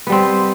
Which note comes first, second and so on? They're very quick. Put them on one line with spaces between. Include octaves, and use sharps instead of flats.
B3 G3 C4